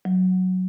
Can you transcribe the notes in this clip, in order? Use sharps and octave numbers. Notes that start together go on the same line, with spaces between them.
F#3